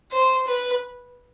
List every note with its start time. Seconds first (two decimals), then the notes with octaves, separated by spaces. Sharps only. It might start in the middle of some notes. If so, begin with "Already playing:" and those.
0.12 C5
0.47 B4